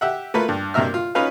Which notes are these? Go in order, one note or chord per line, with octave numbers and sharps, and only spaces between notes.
G4 E5 F#5
A3 A#3 F4 B4
G2
G2 C3 A#3 A#4 E5 F6
F4
C#4 D#4 F4 B4 F5